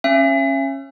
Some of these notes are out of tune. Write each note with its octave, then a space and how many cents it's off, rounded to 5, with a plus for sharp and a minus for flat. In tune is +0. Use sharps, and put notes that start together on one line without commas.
C#4 -25 E5 +40